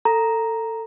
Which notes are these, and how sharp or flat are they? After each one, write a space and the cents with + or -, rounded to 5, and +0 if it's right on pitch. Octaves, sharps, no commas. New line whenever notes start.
A4 +20 A#5 +5